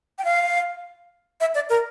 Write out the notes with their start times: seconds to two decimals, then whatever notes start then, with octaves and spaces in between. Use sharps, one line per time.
0.18 G5
0.25 F5
1.40 E5
1.55 D5
1.69 A#4